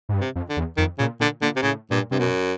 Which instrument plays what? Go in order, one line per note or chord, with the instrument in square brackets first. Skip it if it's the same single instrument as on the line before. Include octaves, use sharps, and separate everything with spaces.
[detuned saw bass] G#2
G2
[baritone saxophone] C3
[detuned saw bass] F2
[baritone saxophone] D3
[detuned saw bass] E2
[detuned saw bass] F2 [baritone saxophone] D#3
[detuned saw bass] A#2 [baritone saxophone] C#3
[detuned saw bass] A#2 [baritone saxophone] D3
[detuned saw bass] A#2 [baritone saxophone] D3
[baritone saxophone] C3
[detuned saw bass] A2 [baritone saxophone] C#3
[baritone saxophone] G2 [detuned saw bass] A#2
[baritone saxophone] G2 [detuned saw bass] C3
[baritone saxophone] F#2 [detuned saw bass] B2